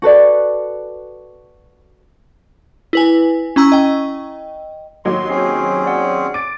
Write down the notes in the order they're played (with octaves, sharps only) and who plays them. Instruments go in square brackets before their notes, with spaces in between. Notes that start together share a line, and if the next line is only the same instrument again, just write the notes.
[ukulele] F#4 A4 B4 D5
[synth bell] E4 B4 G#5
C#4 E4 A#5 C#6 E6
D#5 G5
[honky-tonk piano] D#2 F#3 D#4 [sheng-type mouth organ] C6
[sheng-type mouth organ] C4 C#4 G#4 [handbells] C7
[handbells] D5 F#5
[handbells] D6 A6 [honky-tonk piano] D7